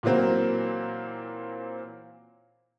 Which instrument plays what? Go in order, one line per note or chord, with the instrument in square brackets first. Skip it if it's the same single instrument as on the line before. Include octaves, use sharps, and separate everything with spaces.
[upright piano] A#2 E3 F#3 A#3 C4